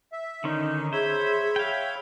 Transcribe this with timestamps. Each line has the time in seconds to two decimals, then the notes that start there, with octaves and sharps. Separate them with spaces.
0.12 E5
0.44 D3 D#3 C#4 D#4
0.93 G#4 C5 C#5 E5 B5
1.56 F5 G5